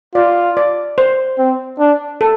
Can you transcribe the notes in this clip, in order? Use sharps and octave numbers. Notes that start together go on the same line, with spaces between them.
F4 D5
D5
C5
C4
D4
A4